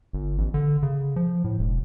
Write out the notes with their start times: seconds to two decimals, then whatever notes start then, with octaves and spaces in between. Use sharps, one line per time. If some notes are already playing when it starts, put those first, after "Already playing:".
0.13 G1
0.38 A1
0.54 D3
0.83 C#3
1.16 F3
1.44 A2
1.59 E1